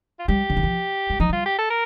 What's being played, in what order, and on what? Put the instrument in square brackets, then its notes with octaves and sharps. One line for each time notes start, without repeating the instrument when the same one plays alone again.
[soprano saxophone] F4
[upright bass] G3 [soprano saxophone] G4
[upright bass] D3
D#3
F3
G3
[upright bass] F3 [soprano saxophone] D#4
[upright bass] G3 [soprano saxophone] F4
[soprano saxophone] G4
A4
A#4